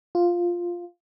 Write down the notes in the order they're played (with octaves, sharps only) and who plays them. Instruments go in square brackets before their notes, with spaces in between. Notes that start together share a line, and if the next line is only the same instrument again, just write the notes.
[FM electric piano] F4